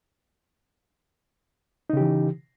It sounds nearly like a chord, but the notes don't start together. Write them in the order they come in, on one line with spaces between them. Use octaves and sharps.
D#4 C#3 G4 E3